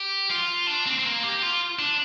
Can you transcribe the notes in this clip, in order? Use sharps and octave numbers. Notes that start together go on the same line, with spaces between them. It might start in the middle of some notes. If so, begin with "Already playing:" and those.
Already playing: G4
F4
D4
C4
C4
A#3
G4
F4
D4